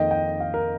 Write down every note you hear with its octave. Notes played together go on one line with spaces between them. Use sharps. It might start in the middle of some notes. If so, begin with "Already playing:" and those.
Already playing: F2 D#3 A#3 D#5 G5
G5
F5
A#4